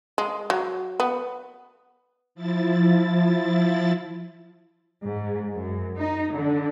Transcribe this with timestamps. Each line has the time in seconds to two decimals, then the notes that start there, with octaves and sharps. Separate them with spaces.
0.18 G#3
0.50 F#3
1.00 B3
2.35 F3 E4 A6
5.03 G#2
5.54 F#2
5.97 D#4
6.32 D3